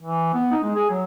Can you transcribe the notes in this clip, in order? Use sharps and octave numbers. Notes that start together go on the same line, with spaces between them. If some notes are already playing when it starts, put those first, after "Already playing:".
E3
B3
D#4
G#3
G#4
F#3